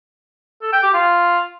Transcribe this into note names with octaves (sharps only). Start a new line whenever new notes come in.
A4
G5
G4
F4